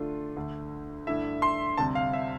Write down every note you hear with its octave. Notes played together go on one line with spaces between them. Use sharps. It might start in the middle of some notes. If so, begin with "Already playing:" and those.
Already playing: D3 A3 D4 F4
D2 D3 A3
G2 D3 A3 E4 E5
C6
D2 C3 G3 C4 A5
F5
E5